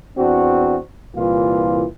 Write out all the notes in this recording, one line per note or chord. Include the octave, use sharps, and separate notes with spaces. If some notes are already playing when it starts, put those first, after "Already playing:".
E2 C4 D4 F#4
C2 A#2 E3 F4